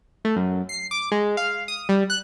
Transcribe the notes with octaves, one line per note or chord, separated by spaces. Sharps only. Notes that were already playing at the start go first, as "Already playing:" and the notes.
A3
F#2
C7
D6
G#3
F5
D#6
G3
F#6